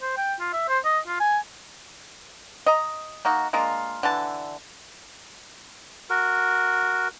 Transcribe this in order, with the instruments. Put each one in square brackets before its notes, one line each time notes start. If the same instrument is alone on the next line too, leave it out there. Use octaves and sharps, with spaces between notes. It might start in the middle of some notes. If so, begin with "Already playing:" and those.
[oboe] C5
G5
F4
E5
C5
D#5
F4
G#5
[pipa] D#5 A#5
A#3 D#4 F#4
G#3 A#3 D4 F4
D3 E3 A5
[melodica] F#4 A#4